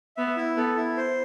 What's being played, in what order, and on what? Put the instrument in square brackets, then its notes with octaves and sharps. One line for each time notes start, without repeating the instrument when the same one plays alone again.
[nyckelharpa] B3 [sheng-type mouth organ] E5
[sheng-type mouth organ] E4
[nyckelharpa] B3 [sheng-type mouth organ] A4
[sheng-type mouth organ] E4
C5